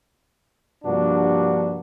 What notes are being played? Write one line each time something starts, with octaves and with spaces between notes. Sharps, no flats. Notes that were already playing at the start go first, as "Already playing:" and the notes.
G2 C3 F3 A#3 D4 F#4